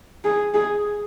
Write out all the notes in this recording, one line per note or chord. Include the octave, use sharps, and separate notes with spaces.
G#4
G#4